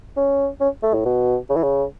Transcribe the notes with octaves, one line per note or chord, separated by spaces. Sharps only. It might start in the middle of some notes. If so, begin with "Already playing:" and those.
C#4
C#4
A3
A2
B2
C#3
E3
C#3